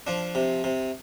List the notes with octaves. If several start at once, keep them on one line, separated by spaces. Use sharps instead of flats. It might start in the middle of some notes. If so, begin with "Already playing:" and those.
F3 D4
C3
C3